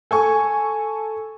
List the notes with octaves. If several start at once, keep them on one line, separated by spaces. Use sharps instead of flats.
A4 G#5 C#6